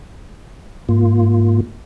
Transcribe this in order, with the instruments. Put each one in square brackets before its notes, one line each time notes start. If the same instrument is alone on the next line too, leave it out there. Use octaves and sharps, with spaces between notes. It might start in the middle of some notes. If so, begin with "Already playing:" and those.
[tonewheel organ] G#2 A#3 F4